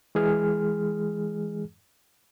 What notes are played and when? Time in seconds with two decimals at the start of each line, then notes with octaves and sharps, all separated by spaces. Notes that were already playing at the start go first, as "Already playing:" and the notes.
0.15 E3 G#3 G#4 F6